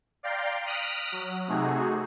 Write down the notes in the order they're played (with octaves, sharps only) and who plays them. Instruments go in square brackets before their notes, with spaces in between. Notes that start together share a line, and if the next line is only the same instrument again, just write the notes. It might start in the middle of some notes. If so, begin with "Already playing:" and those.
[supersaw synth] D5 F5 G5 A#5 C6
D#6 F6 F#6 A#6 B6 D7
F#3
C3 A3 D#4 F#4 G#4